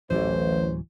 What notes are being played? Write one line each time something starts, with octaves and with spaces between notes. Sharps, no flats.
D1 A1 E3 F#3 C5